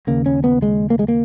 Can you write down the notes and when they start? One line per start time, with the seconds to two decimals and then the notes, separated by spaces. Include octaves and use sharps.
0.07 D#2 C#3 A#3
0.26 C#4
0.44 B3
0.62 G#3
0.90 A#3
0.99 G#3
1.08 A#3